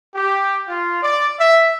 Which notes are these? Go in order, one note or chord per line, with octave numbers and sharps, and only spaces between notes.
G4
F4
D5
E5